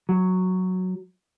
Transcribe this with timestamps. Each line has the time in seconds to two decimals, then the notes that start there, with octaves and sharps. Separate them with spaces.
0.09 F#3